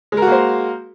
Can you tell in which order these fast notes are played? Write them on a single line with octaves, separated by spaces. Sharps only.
G#3 A#4 F#4 A#3 C5